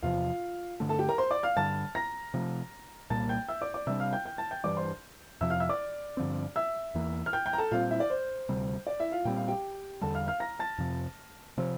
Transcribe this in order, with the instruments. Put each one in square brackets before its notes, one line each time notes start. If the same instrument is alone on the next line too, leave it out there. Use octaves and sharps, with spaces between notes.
[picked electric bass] E2 C3 F3 [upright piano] F4 F5
[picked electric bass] G2 D3 A3
[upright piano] A4 A5
G4 G5
A#4 A#5
C5 C6
D5 D6
F5 F6
[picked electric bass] G2 D3 G3 [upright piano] A5 A6
[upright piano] A#5 A#6
[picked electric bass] C3 F3 A3
[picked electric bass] C2 A#2 G3 A#3 [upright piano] A5 A6
[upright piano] G5 G6
E5 E6
D5 D6
D5 D6
[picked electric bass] C3 G3 D4 [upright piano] E5 E6
[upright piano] F5 F6
G5 G6
G5 G6
A5 A6
G5 G6
[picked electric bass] G2 E3 G3 [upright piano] D5 D6
[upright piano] C5 C6
[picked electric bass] F2 C3 F3 [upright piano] E5 E6
[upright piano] F5 F6
E5 E6
D5 D6
[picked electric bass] G2 D3 F3 C4
[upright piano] E5 E6
[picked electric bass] E2 E3 A#3
[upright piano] F6
G5 G6
G5 G6
A#5
A4 A5
[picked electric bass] A#2 G3 C4 [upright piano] F4 F5
[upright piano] E4 E5
D5
C5
[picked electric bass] D2 C3 G3
[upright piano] D5
E4 E5
F4 F5
[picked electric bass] A#2 G3 C4 [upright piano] G5
[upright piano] F5
G4 G5
[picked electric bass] E2 D3 G3 [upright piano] A4 A5
[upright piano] F5 F6
F5 F6
A#5 A#6
A5 A6
[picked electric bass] F2 C3 F3
C3 F3 C4